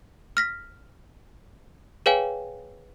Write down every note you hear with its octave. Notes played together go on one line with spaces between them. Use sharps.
F6 A#6 B6
G#4 B4 C#5 F5 G5 G#5